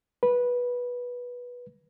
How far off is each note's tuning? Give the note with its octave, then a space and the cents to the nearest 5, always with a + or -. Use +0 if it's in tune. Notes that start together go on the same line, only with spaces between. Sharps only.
B4 -15